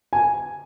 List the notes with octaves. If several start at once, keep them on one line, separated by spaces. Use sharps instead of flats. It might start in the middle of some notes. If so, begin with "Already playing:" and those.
G#5